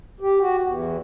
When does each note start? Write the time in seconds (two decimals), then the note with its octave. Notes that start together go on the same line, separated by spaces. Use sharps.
0.20 G4
0.40 F#4
0.63 E2